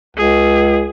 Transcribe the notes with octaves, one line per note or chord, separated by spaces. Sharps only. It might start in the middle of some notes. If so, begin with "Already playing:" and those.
C#2 G#4